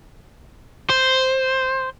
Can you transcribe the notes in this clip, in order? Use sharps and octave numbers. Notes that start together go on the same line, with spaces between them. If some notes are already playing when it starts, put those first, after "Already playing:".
C5